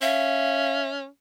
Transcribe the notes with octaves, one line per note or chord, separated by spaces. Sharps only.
C#4 E5 F5